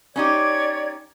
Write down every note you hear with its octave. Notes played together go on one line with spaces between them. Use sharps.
C#4 D#4 G4 C#5 D5 G#6